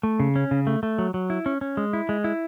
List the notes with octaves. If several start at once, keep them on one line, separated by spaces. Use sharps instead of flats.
A3
C#3
C#4
C#3
A3
A3
F#3
F#3
E4
C#4
C#4
G#3
E4
G#3
E4